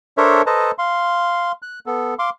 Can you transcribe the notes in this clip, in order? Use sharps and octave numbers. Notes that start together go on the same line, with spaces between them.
D4 A4 A#4 C5 C#5 E5
A4 B4 C5 D#5 A5 A#5
F5 C6
F#6
B3 A4
F5 C6 D6